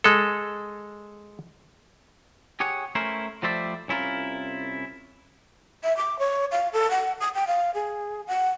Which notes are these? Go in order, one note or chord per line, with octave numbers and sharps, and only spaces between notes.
G#3 A4
G4 G#4 C#5 F#5
A3 C#4 E4 A#4 C5
F3 G3 A3 C5 D5 E5
C2 C#4 E4 F4 A#4
E5
D6
C#5
F5
A4
F#5
D#6
G5
F5
G#4
F#5